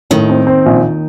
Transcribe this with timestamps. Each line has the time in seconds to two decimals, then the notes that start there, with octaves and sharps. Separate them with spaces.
0.11 D#2 A2 D#3
0.30 C4
0.47 C4
0.66 A#1